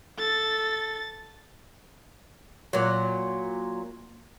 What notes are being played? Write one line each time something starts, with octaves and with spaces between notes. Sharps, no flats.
A4 A6
A#2 F#3